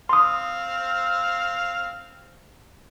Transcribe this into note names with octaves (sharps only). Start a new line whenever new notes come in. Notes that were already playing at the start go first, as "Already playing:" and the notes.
C4 F5 C6 D#6